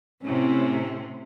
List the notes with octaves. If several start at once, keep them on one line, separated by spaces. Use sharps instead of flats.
A2 C3 C#4 E4